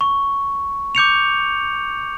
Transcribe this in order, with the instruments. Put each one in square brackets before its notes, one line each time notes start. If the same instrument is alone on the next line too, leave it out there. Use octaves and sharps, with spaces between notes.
[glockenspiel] C#6
D6 G6 C#7 F7